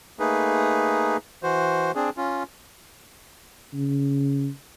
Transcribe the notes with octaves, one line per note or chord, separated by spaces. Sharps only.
A3 A#3 D#4 G#4 B4
E3 F#4 C5
C4 D4 G#4
C#4 F4
C#3